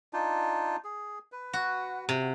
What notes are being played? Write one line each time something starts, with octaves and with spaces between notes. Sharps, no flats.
D4 D#4 F4
G#4
B4
F#4
C3